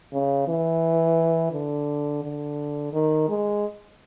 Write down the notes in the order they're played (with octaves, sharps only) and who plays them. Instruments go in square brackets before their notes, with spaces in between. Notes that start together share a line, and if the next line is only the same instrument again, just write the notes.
[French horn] C#3
E3
D3
D3
D#3
G#3